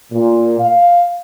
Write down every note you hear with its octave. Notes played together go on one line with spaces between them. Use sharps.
A#2
F5